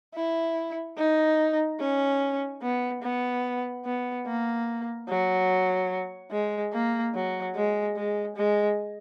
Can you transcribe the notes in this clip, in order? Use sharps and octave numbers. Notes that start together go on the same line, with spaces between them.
E4
D#4
C#4
B3
B3
B3
A#3
F#3
G#3
A#3
F#3
G#3
G#3
G#3